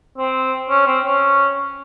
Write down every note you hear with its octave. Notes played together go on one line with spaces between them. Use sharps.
C4
C#4
C4
C#4